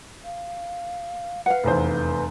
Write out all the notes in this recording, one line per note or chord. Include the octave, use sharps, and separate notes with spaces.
F5
B4 F5 F#5
F1 E2 C5